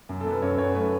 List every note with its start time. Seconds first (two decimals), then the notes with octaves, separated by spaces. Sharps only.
0.09 F#2
0.21 A4
0.25 F#2
0.31 B4
0.42 F#2 C#5
0.58 F#2 C#5
0.75 A3 B4